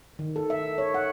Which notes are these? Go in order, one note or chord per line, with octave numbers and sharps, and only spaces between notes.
D#3
A4
E5
C#5
F#5